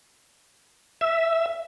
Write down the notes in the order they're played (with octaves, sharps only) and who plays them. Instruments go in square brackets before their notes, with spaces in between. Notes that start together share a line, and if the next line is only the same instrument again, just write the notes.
[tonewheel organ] E5